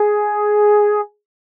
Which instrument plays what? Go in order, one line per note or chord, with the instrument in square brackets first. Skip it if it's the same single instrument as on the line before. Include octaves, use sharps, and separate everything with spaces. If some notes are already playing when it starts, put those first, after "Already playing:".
Already playing: [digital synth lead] G#4